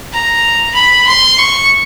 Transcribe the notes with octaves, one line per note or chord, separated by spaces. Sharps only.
A#5
B5
C6
C#6